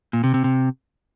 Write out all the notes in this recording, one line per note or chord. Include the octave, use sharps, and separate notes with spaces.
A#2
C3
C3
C3